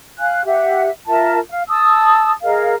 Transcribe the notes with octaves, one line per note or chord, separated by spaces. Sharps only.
F5 G#5 F#6
G4 E5 F#5
F4 A#4 E5 A5
F5
A5 D#6 E6
G#4 A#4 D#5 F5